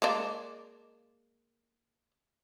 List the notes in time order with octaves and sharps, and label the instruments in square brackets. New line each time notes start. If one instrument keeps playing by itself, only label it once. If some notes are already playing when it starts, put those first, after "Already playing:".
[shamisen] G#3 A#3 D4